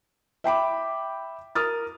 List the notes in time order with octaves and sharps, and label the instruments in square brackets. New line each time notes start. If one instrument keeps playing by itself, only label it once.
[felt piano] E5 G5 B5 D6
A#4 D#6 F6 A6